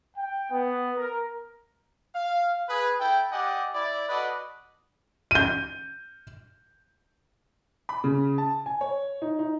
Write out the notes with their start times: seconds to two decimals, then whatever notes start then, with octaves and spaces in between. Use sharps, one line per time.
0.16 G5
0.51 B3
0.97 A#4
2.15 F5
2.69 G#4 B4
3.00 E4 A4 G5
3.31 G4 D5 D#5 F#5 G#5
3.74 E4 D5
4.09 F#4 A4 B4 D5 D#5
5.31 G6 D#7
7.89 B5
8.04 C#3
8.38 A5
8.66 G#5
8.81 C#5
9.22 D#4
9.39 D#4